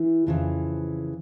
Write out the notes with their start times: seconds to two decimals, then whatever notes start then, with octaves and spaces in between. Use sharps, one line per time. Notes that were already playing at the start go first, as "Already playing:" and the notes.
Already playing: E3
0.27 F2 C#3 E3